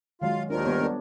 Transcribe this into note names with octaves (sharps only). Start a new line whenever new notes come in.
D#3 F#3 G#3 F4 F5
D#2 D#3 D4 F4 A#4 C5
G3 B3 C#5
B3 D4 A4